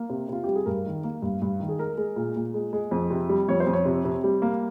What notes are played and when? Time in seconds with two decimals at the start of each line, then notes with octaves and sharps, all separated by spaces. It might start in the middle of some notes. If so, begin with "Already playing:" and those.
Already playing: A#3
0.10 C3
0.29 C3 F4
0.44 G3 G4
0.55 G#4
0.66 G2 A#4
0.86 D#3
1.04 A#3
1.22 G2
1.42 G2
1.60 D#3
1.69 G#4
1.79 G#3 A#4
1.97 G#3
2.16 A#2
2.36 A#2
2.54 G#3
2.73 G#3
2.91 F2
3.11 C3
3.29 G3
3.48 F2 C#5
3.60 C5
3.66 F2
3.73 C#5
3.85 C3
4.05 C3
4.24 G3
4.42 A#3